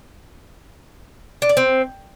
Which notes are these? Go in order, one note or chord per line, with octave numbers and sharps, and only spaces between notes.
D4
D5
C4